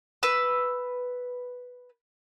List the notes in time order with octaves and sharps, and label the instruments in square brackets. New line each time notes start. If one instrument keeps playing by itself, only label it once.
[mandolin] B4 E6